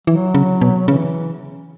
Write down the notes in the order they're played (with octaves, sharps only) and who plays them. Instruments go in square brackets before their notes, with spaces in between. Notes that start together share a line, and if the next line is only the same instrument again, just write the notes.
[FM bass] E3 [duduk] F#3
[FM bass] C#3
B2
[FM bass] C#3 [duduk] E3